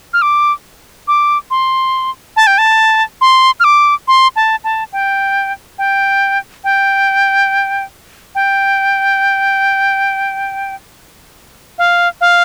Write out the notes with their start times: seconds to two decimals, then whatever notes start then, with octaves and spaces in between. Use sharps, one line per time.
0.13 F6
0.22 D6
1.08 D6
1.51 C6
2.37 A5
2.47 G5
2.58 A5
3.21 C6
3.60 F6
3.64 D6
4.08 C6
4.36 A5
4.64 A5
4.93 G5
5.78 G5
6.64 G5
8.35 G5
11.78 F5
12.21 F5